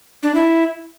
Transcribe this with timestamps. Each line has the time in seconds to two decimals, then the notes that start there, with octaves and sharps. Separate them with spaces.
0.23 D4
0.35 E4